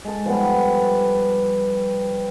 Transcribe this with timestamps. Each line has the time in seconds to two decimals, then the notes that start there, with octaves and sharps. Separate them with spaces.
0.05 G#3 A4
0.26 F3 G3 B3